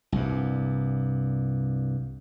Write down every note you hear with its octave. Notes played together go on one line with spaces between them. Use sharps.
C2 G2